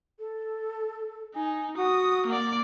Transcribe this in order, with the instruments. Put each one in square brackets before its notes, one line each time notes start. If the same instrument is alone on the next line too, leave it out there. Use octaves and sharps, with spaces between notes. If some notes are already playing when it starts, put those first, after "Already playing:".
[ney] A4
[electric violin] D#4 [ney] G#5
[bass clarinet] F#4 [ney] F#5 [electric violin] D#6
[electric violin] A#3 D5